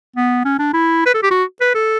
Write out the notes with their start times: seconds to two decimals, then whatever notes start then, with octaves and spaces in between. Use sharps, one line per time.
0.16 B3
0.45 C#4
0.59 D4
0.73 E4
1.06 B4
1.14 A4
1.23 G4
1.31 F#4
1.61 B4
1.75 A4